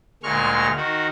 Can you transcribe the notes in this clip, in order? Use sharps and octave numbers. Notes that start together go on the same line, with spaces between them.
D2 A#2 G#3 C#6 F6
D#3 F#4